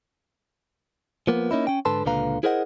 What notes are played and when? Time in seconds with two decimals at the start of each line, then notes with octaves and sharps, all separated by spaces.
1.27 F3 A#3 B3
1.51 A#3 C#4 D#4 E4
1.67 C#4 G5
1.85 G#2 D3 A4 B4 A5 C6
2.06 C#2 A#2 D3 B4 F5 A#5
2.43 E4 G#4 A#4 C5 D#5 F#5